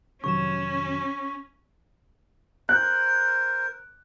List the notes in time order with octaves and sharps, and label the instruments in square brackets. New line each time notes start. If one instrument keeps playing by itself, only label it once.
[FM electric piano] F2 D#3 [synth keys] C3 F#3 E7 [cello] C#4 [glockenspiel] C#6
[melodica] A#4 C5 [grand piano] F#6